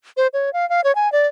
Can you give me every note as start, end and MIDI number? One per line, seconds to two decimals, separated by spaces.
0.17 0.28 72
0.33 0.53 73
0.53 0.68 77
0.70 0.81 77
0.84 0.94 73
0.95 1.11 80
1.12 1.27 74